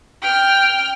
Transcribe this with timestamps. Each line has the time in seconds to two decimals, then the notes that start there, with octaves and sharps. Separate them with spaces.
0.22 G5 F6